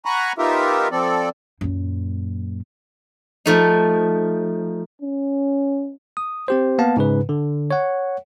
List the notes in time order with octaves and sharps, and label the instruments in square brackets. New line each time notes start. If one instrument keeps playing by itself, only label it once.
[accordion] F#5 G#5 A#5 B5 C#6 F#6
B3 D#4 F4 G4 A#4 E5
F3 C4 A4 D5
[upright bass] F#2 A#2
[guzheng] F3 A3 D#4
[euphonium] C#4
[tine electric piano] D#6
C4 G4 C5
A#3 B3 F5 A5
G#2 C#3 B4
D3
C#5 F#5